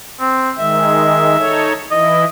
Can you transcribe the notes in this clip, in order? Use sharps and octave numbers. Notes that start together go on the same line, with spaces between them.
C4
D#3 G#3 E5
D#4 A4 C#5
E3 E4 D#5